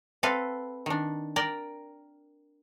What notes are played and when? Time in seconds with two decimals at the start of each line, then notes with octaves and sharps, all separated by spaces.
0.23 C4 A4 B4 F5
0.86 D#3 D4
1.36 A#4 D5 G5